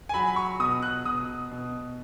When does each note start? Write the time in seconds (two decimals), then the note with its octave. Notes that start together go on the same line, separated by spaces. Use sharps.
0.09 G#5
0.14 F#3 B5
0.27 B5
0.36 C#6
0.60 B2 D#6
0.82 F#6
1.05 B2 D#6
1.52 B2